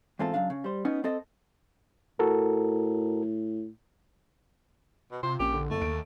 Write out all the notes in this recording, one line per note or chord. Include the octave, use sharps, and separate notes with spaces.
E2 G#2 C4 F4 A4
F#2 C#3 D4 F5
C#3
G3 C5
B3 C#4 D#4
C4 A4 D#5
A2 F#4 A4 A#4
B2
C3 F4 C5
A#1 A#3 C#4 G4
D3
F#1 A3
D#2 D7